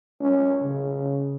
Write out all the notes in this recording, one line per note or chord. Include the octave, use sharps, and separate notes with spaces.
C#4
C#3